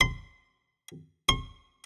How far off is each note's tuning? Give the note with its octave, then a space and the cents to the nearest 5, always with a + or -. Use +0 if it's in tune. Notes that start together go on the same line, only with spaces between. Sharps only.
C6 -20
C6 +45